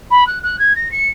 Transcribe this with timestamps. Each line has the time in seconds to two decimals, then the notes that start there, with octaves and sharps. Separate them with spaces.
0.10 B5
0.26 F#6
0.43 F#6
0.59 G#6
0.75 A#6
0.91 C#7